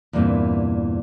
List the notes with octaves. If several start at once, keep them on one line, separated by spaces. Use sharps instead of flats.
E2 G2 A#2 E3 A#3 C4